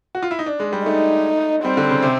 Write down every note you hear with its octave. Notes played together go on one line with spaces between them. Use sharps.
F#4
F4
E4
D#4
D4
G#3
G3
A3 D#4
G3 C4
D3
C#3
C3